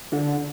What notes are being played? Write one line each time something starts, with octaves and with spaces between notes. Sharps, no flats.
D3